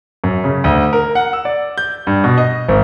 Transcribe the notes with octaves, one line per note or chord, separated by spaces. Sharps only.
F#2
C#3
D2
A#4
F#5
E6
D5
G6
G2
B2
D#5
G#1